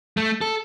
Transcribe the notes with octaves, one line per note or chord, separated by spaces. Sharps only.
A3
A4